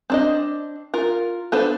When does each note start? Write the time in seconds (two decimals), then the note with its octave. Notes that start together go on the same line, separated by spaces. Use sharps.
0.10 C4 D4 D#5
0.94 F4 A#4
1.52 B3 D4 A4 B4 C5